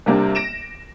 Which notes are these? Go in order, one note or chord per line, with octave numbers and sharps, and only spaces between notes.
C3 G3 A#3 D4 G4
A#6 D7 E7